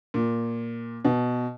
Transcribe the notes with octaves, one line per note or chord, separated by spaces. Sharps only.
A#2
B2